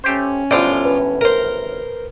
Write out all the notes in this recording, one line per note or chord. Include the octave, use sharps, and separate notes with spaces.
A3 C#4 G4 C5
G1 F#2 A2 F4 C5 D5
B4
A#4 C5